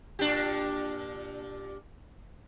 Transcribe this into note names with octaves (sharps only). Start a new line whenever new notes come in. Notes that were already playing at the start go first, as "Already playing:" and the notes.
A#2 D4 G4